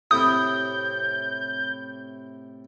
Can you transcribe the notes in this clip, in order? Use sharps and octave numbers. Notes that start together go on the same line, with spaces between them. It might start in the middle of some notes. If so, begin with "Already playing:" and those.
A2 C3 E4 D#6 G6